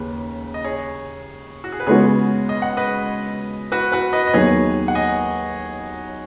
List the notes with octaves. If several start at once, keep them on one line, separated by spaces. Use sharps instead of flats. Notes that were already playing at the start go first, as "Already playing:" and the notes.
Already playing: D#2 C#3 B4
D#5
G#4 C#5
F#4
G#4
B4
C#3 G#3 B3 F#4 G#4 C#5
D#5
F#5
B4 D#5
F#4 B4
F#4 B4
B4 D#5
D#5
D#2 D#3 F#3 B3 G#4 C#5
F#5
D#5 G#5